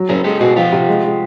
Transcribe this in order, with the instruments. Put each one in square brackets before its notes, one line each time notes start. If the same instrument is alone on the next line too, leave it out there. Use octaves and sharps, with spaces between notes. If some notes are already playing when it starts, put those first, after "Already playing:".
Already playing: [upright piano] F#3
[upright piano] F#1 [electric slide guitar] G#4 A#4
[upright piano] G#3 [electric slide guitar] G4 A4
[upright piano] B2 [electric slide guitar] F#4 G#4
[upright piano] F3 [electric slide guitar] F4 G4
[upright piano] C3
G#3
G#3